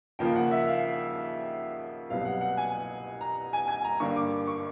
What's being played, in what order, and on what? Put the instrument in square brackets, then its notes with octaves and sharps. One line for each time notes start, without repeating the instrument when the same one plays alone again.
[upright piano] D#2 C#3 F3 A#3 G5
F#5
E5
F5
C2 B2 F#3 B3 F5
F#5
F#5
G#5
A#5
G#5
G#5
A#5
G2 D3 G3 A#3 C#6
D6
D6
C#6